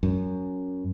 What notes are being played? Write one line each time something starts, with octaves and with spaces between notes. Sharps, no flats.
F#2